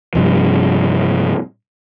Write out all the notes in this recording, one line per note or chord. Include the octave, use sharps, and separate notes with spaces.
G2 C3 F3